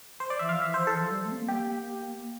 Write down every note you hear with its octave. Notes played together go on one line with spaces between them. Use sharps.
C5
D5
E3 E5
F3 F5
E3 E5
C5
E3 A4
F3
G3
A3
C4
A#3
G4